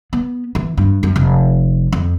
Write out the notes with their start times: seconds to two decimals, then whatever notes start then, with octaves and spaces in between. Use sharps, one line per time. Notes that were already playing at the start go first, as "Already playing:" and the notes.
0.13 B3
0.55 E3
0.77 G2
1.03 F#2
1.16 F1
1.93 F2